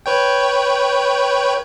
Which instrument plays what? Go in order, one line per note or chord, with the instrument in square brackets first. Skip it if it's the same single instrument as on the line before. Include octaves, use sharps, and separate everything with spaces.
[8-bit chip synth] B4 C#5 G5